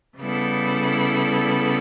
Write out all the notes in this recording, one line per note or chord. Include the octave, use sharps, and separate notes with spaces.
C#3 G3 B3 E4 A4